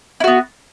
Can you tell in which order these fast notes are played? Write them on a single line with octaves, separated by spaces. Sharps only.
E4 F#4 B3